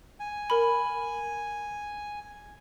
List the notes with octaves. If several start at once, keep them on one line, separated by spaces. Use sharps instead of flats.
G#5
A#4 B5